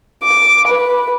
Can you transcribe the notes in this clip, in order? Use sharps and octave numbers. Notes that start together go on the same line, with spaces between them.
D6
B4